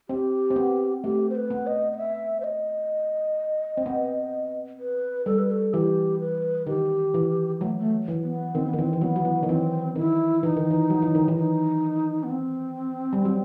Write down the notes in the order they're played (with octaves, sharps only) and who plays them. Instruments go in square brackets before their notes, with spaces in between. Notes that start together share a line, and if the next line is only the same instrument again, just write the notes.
[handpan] C4 [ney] G4
[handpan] C4
B3
[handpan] A3 [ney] G4
[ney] C5
B4
[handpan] B3
[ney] D#5
D#5
E5
C5
D#5
[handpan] C4
B3
[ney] B4
[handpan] G3 [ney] A4
[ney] B4
A4
[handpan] E3 [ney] G4
[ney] B4
[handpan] D#3 [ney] G4
[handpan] E3
[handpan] F#3 [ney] A3
[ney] A3
[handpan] E3
[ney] B3
[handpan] D#3 [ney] C4
[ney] B3
[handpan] D#3
[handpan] E3 [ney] C4
[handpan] E3
[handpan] F#3 [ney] B3
[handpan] F#3
E3
D#3
[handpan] E3 [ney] C4
[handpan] D#3 [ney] E4
[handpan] E3 [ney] D#4
[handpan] D#3
E3
F#3
E3
D#3
E3
[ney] D#4
B3
C4
[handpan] G3
F#3